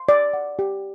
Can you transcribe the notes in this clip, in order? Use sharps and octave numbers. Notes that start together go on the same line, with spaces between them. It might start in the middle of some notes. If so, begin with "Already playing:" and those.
Already playing: C6
D5
F#5
G4